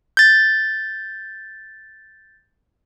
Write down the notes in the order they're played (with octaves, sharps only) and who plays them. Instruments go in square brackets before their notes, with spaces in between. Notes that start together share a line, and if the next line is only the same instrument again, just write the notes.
[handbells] G6 A6